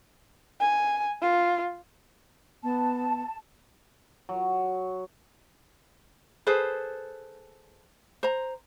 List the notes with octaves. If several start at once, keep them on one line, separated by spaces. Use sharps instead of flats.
G#5
F4
B3 A5
F#3
G#4 A4 B4 C5
C5 A#5